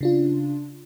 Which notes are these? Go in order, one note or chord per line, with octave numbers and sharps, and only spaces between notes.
C#3 D4 F4